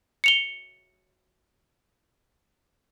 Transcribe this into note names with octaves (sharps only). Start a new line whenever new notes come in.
C#7 F7 G7